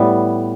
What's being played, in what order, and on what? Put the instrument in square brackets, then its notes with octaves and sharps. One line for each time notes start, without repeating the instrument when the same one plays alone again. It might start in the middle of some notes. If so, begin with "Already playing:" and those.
Already playing: [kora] A2 G3 B3